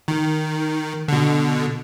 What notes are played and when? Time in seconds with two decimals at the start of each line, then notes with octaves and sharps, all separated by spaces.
0.08 D#3
1.08 B2 D3